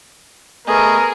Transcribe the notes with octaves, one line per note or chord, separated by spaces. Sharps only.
A3 B3 G#4 A#4 D#5